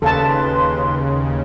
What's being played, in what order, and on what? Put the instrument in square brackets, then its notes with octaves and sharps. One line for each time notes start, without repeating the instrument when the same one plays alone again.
[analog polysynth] D#2 C#3 [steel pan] A4 F5 A5 [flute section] B4 C6